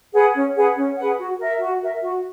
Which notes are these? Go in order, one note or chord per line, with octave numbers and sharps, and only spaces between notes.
G#4 B4 F#5
C#4
G#4 B4 F#5
C#4
G#4 B4 F#5
F#4
A#4 E5
F#4
A#4 E5
F#4